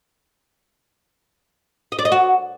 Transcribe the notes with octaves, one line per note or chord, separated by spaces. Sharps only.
D#5
D5
D#5
F#4